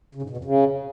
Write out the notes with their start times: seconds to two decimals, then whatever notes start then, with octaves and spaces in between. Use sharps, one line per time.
0.15 C#3
0.22 G#2
0.30 B2
0.37 F2
0.45 C#3